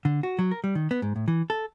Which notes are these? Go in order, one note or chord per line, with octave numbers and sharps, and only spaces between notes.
D3
F#4
F#3
A#4
G3
D#3
B3
G#2
A2
E3
A4